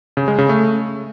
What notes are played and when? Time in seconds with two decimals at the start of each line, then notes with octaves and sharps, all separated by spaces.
0.17 C#3
0.28 G#3
0.38 C#3
0.49 A3